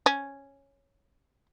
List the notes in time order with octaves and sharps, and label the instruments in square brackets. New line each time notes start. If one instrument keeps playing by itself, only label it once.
[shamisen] C#4